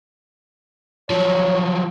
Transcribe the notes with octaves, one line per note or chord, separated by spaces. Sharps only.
F3 F#3 C#5